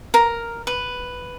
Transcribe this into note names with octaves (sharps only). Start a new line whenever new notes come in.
A#4
B4